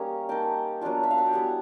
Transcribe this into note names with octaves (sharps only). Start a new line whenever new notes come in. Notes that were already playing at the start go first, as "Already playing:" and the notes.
Already playing: G3 A#3 C#4 D#4
A#3 D#4 G5 A5
F#3 B3 D4 F4
E5
F5
F#5
G5
G3 B3 E4 F#5 G#5